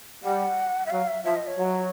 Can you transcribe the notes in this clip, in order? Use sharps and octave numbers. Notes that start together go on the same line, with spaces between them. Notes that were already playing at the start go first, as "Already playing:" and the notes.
G3 F#5
E5
F#3 F5
E5
F3 E5
D#5
C#5
F#3